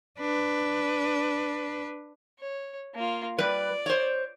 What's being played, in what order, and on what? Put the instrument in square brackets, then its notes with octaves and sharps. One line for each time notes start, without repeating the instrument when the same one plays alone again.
[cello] D4 B4
[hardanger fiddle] C#5
A#3 F4
[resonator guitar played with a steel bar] G3 B4 [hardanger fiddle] D5
[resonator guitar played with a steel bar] C5 C#5